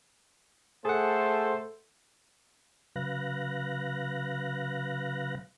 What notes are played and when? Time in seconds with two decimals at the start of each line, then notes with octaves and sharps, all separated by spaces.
0.85 A3 G#4 A4 C5 F#5
2.96 C#3 F#3 B4 F5 F#6 A#6